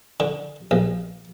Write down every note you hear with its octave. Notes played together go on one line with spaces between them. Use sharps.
D3
A#1